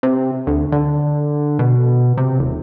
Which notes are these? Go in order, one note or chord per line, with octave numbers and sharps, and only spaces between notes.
C3
D2
D3
B2
C3
D#1